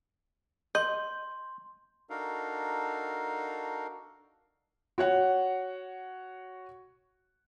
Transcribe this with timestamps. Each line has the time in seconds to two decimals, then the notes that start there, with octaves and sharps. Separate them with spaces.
0.75 D#5 C6 G6
2.10 D4 D#4 F#4 A4 A#4 F5
4.98 F#4 C#5 F#5